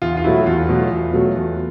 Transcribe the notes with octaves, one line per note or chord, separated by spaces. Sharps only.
E2 F4
F4
B2 F#3 A3 E4
E2 F4
B2 F#3 A3
E2
B2 F#3 A3
E2